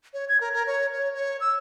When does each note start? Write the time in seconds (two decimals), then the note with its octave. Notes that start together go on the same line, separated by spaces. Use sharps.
0.14 C#5
0.29 G#6
0.41 A#4
0.53 A#4
0.67 C#5
0.92 C#5
1.14 C#5
1.40 E6